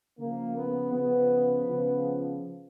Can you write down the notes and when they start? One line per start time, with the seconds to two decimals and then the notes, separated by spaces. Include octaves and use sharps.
0.19 C#3 F3 A#3
0.57 B3
0.94 C#3 F3 B3
1.69 C#3 F3